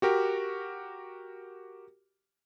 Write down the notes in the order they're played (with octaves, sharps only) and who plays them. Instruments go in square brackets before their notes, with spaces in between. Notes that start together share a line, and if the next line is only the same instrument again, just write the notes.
[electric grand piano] F#4 G4 A#4